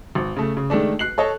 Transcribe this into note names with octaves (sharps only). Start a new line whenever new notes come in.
G#1
C#3 A3
C#3
D#3 G#3 A3 D4
F#6 C7 F#7
A4 C#5 D#5 A5